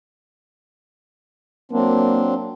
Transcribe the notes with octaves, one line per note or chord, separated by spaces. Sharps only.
F#3 A#3 C4 D4